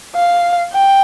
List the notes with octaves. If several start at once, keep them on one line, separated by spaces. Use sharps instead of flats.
F5
G5